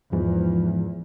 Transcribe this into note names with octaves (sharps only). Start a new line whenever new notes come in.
E2 G#2 F3